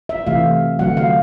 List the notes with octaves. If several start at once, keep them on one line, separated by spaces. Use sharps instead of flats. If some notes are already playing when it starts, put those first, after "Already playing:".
E5
C3 E3 A3 F5
D3 F#3 A3 F#5
F5